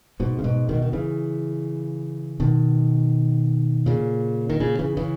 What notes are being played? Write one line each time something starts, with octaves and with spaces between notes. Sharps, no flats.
G#2 B2
C#3
G#2 B2
B2 D#3
D#3
C#3 E3
B2 D#3
A#2 C#3
D#3
A#2 C#3
C#3 E3
C#3 E3